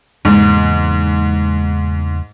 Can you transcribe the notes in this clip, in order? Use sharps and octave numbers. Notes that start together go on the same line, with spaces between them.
E2 G#2 C#3 A#3